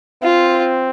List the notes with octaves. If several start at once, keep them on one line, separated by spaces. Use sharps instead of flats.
C4 F4